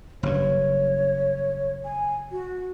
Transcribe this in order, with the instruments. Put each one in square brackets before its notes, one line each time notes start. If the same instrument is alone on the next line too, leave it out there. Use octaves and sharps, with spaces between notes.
[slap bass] F#1 G2 [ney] C#5
[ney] G#5
F#4